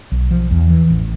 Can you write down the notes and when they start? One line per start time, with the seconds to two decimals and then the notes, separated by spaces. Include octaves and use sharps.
0.12 B1
0.31 F3
0.51 E2
0.70 E3
0.90 A1